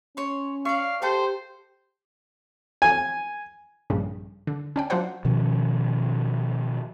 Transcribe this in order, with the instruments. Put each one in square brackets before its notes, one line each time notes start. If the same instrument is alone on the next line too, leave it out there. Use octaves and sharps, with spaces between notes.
[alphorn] C#4 [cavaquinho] C#5 C6
[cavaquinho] D5 C#6 [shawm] F5
[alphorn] G4 [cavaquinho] A4 G5 C6 [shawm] C5
[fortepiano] G#5
[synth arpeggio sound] A#1 G2 C#3 G3
D3
C#4 D4 G5
F#3 D4 F4 A#4 C5 F#5
[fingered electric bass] B2 D#3 F3 C#4